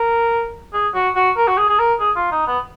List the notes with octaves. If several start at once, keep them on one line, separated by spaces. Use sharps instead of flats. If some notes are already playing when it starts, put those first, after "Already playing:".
Already playing: A#4
G#4
F#4
F#4
A#4
F#4
G#4
G#4
A#4
G#4
F4
D#4
B3